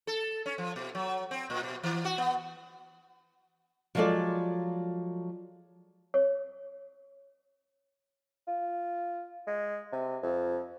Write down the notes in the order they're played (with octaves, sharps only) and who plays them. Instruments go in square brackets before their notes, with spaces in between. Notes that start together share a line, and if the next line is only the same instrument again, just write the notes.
[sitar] A4
C#4
F3
B2
F#3
C4
A#2
B2
E3
F#4
B3
[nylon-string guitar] F3 F#3 G#3 F4 A4 D5
[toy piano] C#5
[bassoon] F4
G#3
C3
F2